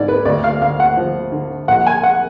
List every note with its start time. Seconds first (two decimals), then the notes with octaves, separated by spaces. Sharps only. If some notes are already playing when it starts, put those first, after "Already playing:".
Already playing: G#2 D5
0.08 B4
0.25 D2 D5
0.44 F5
0.61 D2 F5
0.80 F#5
0.97 F3
1.32 D3
1.68 A#1 F#5
1.87 G#5
2.03 F#5